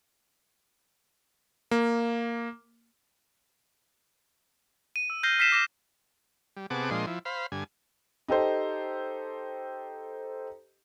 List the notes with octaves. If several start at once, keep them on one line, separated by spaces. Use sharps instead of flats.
A#3
D#7
E6
F6 G6 A#6 C7 G7
F6 B6 C7 E7
D6 A#6 E7
G3
C3 B3 G#4 F#5 A5 D6
A#2 F3 G#3 D4 D#5 C6
F3 E4
C5 F5 B5
G2 D3 G#5
D#4 G4 A4 C5